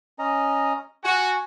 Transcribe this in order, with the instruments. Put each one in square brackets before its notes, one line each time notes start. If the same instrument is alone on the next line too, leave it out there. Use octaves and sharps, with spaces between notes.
[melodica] C#4 D#5 A#5
[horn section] F#4 [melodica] G#5